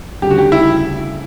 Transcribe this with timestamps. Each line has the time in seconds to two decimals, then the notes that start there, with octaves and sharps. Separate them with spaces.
0.22 D2 C#3 G3 D4 G4
0.31 F#4
0.39 G4
0.52 E4